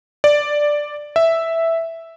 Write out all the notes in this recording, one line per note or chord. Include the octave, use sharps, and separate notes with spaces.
D5
E5